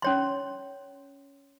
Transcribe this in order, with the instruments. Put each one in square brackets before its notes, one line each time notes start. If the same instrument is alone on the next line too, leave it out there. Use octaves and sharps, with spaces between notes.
[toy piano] C#4 C#5 C6